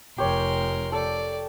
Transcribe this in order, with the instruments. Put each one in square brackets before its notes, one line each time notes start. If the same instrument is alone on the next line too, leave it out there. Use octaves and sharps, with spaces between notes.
[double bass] F1 [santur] G4 C#5 [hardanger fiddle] A#4 C6
[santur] A4 [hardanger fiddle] D5